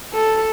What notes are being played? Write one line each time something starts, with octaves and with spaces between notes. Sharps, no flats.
A4